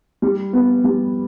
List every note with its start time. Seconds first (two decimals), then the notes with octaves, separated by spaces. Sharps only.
0.22 G3
0.53 B3
0.84 G3